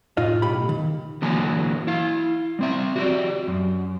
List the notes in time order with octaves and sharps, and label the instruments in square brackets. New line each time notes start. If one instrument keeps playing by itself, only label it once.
[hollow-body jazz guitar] A2 D#4 F4 D#5
B1 A2 G4 B5
D#3
[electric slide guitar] D3 E3 F#3 A#3 G#5
E4 F5
G3 C4 E5
F#4 G4 D5
F#2